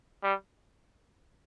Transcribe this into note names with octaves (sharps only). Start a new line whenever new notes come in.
G3